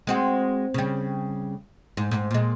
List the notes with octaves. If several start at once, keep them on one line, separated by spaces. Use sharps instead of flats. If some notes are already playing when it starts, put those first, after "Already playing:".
G#3 C4 F#4
C#3 G3
G#2
G#2
A#2 G#3